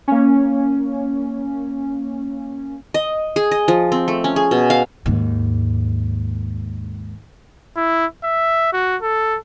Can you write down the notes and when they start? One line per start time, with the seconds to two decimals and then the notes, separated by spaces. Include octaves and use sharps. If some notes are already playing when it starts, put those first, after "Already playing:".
0.08 A#3 C#4
2.94 D#5
3.36 G#4
3.52 D#5
3.68 F3
3.92 C4
4.08 A3
4.24 C#4
4.36 G#4
4.51 B2
4.70 F5
5.06 D#2 G#2
7.76 E4
8.24 E5
8.73 F#4
9.02 A4